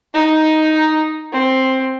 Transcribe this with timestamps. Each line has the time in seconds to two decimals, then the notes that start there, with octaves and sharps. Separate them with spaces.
0.14 D#4
1.33 C4